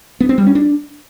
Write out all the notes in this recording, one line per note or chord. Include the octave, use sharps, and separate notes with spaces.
B3
C4
G3
C#4
D4